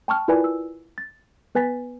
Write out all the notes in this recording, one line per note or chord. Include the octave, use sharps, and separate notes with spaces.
G5 A5 C#6 F6
E4 F4 A#4 B4 D5 G#5
E6
A6
B3 B4 G#5 A6 B6